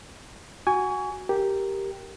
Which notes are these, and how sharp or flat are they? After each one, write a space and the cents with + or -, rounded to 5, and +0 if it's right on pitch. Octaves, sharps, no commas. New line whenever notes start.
F#4 +0 G#5 -5 C#6 +30
G4 +0 A#4 +0